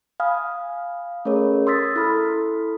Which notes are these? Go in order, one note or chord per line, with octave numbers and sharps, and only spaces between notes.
F5 G#5 B5 D#6 F6 G#6
A3 C#4 G#4 A#4 C#5
C6 D#6 E6 G#6 A6 B6
E4 A4 B5 D#6 F6